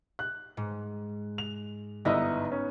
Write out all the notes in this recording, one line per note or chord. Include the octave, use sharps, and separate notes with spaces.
F#6
G#2
F7
G1 B3 D#4 E4 D#5
C#4